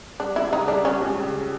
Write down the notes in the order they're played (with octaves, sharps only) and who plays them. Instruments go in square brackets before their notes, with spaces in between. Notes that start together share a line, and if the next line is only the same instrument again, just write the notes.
[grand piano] G3 [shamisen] D4
[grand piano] C#2 [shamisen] E4
[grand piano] C#3 [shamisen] D#4
[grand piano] G3 [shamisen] D4
[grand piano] G3 [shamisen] C#4
[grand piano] C#2
C#3